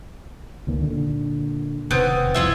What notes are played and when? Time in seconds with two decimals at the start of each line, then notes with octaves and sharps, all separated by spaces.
0.67 C#2 D#3 A#3
0.83 A#2 D3
1.91 E1 C3 D#3 B3 C4
2.34 E1 C2 F2 E4 F4 E5